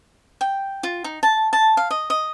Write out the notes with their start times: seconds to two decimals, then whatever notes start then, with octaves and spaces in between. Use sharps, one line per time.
0.41 G5
0.83 F4
1.04 D#4
1.23 A5
1.53 A5
1.77 F5
1.91 D#5
2.10 D#5